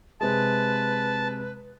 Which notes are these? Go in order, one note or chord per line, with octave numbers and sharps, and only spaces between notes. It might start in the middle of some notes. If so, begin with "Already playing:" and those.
C3 G#3 B4 A5